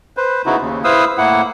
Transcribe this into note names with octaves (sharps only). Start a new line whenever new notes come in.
B4 C5
C#3 B3 D#4 E4 F#4
D#2 C#3
E4 B4 C5 F5 D#6 E6
A2 A#3 E4 F#5